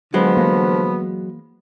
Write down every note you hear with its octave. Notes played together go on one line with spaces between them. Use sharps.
D3 F3 F#3 G#3 B3
E3 A#3